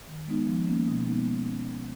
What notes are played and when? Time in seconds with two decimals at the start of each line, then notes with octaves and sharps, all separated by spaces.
0.08 D#3
0.27 G#3 B3 D#4
0.47 F3
0.68 A#3 C#4
0.88 B2
1.08 G#3 B3 D#4
1.27 F3
1.48 A#3 C#4
1.68 B2